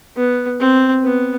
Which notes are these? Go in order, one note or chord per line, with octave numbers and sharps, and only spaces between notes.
B3
C4
B3